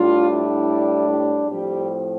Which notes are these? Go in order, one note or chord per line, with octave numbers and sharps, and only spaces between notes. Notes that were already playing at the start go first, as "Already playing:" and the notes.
Already playing: A2 G3 D4 F4
E4
G3 G4
A2 F3 G3 C4 G4